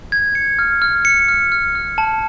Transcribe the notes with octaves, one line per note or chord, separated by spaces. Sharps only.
G#6
C#7
F6
F6
C#7
F6
F6
F6
A5